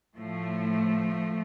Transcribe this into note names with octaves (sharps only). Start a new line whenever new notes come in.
A2 F3 A3